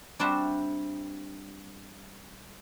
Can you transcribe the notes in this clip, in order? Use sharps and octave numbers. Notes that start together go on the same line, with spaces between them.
G3 C4 D4 F#4 C5 E5